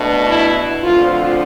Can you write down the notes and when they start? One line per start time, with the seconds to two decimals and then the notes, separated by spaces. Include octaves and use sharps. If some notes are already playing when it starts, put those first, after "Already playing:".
Already playing: B2 A3 D4
0.27 E4
0.83 D2 D3 F3 C4 F4